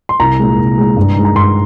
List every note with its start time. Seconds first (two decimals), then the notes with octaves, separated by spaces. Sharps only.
0.09 C6
0.19 C2 A#5
0.39 A#2 G#3
0.58 C2
0.78 A#2 G#3
0.97 G2
1.16 D#3 G#3
1.25 A#5
1.35 G2 C6